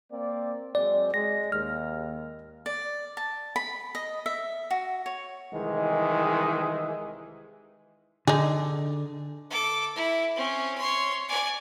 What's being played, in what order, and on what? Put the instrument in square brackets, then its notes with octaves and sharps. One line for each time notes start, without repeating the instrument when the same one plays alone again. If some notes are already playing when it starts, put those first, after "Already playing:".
[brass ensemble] A#3 C4 D5
[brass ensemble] F#3 G#3 C4 [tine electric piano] D5
[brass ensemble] G#3 [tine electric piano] A#6
[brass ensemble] D#2 [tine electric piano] F6
[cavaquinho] D5
A5
B5
D#5
E5
F#4
C#5
[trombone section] C2 D#3 E3 G#3
[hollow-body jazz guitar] D3 [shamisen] D#4 G#4
[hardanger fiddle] A4 D6
E4
C4 C#4
C#5 C6
D5 G#5